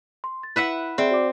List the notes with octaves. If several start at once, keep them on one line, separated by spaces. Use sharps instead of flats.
C6
A6
E4 B4 E5 F#5
C4 G#4 D5 E5
F#4 D5 D6